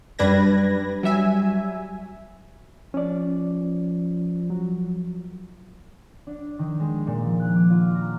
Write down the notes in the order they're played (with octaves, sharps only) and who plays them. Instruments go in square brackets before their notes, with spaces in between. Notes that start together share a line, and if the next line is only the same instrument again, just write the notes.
[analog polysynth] F#2 G3 D4 B4 G#6 A#6
F#3 G3 E5 G#5
[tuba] F3 [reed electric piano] C#4 D5
[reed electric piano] F#3
[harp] D4
D#3
G#3
A#2
F3
F#6
D6
F4
A#5